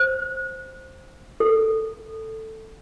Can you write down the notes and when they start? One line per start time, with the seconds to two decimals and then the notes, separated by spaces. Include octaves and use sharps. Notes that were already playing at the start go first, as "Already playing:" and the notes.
Already playing: C5
1.40 A4